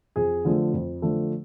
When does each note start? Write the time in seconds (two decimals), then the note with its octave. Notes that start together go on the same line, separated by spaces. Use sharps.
0.16 F2 G#4
0.45 D3 F3 A3
0.73 F2
1.02 D3 F3 A3